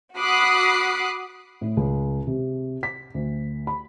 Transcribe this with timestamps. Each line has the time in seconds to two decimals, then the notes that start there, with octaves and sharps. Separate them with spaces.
0.18 F#4 B5 D6 D#6 F#6 C7
1.61 A2
1.77 C#2
2.27 C3
2.83 B6
3.14 D2
3.67 B5